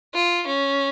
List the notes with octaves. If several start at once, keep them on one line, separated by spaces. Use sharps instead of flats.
F4
C#4